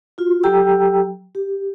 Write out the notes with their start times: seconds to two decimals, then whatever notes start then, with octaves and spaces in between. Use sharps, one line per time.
0.18 F4 F#4
0.43 F#3 G4 A4 G5 A#5 E6
1.35 G4